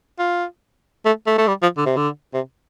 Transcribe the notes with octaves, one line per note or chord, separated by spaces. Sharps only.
F4
A3
A3
A3
G3
F3
D3
C3
D3
C3